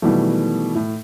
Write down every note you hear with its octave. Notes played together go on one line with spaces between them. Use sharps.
B2 D#3 E3 F#3 G3 A3
A2